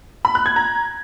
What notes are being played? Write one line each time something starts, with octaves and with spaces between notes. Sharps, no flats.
B5
F#6
G#6
A#5